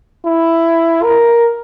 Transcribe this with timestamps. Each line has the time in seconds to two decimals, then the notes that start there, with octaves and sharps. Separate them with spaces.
0.25 E4
1.03 A#4